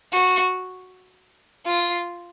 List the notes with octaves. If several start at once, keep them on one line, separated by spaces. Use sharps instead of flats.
F#4
F4